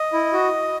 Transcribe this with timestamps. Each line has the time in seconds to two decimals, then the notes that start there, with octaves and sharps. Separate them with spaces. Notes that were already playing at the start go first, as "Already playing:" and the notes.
Already playing: D#5
0.13 E4
0.33 F#4